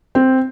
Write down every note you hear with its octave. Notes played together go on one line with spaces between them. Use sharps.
C4